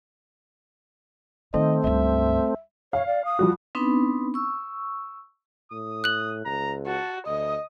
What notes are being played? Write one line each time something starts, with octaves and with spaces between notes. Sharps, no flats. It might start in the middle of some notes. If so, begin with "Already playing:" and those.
D#3 A3 C4 D#5
C#2 G2 E5
C#5 F5
D5
D#6
F3 G3 F#4
B3 C4 D4 D#4 B4 B5
C#6 E6
A2 D#6
F#6 F#7
C#2 A#5
F#4 A5
D2 D#5 D#6